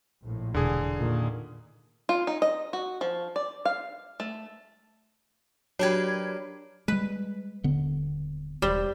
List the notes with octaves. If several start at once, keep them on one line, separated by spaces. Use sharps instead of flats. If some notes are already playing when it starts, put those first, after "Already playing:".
A#1 A2
E1 D3 G#4
A#2 D#3
F4
D#4
D#5
F#4
F3
D5
F5
A3
F#3 D4 G4 A#4 B4 C#5 G#6
G3 G#3 B4
D#1 D3 B3
E1 G3 C5